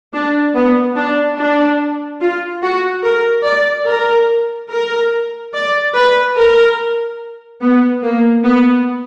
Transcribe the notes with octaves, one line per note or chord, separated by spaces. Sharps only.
D4
B3
D4
D4
F4
F#4
A#4
D5
A#4
A#4
D5
B4
A#4
B3
A#3
B3